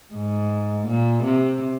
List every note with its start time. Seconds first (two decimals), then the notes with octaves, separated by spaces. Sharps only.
0.14 G#2
0.87 A#2
1.23 C3